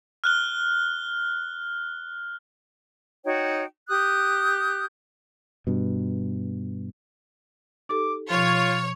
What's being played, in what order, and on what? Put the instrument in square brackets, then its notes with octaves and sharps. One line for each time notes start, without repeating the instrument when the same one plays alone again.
[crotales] F6 F#6 G7
[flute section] D#4 F#4 C#5 G5
G4 D#6 F#6 G6
[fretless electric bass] G2 B2
[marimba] D#4 G4 A4 [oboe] D6
[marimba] B2 F3 [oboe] F4 [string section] C#5